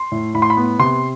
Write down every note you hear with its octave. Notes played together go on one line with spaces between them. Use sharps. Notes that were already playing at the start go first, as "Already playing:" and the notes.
Already playing: C6
A2
A2 B5
C6
B5
B3
C3 C6